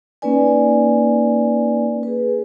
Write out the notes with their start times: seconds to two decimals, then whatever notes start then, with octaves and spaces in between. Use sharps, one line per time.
0.22 A#3 C#4 D#4 B4 D5 G#5
2.03 G#4 B4